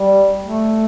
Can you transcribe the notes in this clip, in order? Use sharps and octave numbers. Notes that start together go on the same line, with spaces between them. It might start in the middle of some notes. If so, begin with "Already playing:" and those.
Already playing: G3
A3